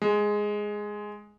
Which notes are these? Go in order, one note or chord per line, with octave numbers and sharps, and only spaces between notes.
G#3